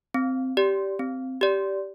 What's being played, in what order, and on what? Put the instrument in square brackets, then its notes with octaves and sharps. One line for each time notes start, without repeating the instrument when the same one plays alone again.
[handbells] C4
G4 D5
C4
G4 D5